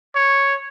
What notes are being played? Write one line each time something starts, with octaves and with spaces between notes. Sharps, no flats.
C#5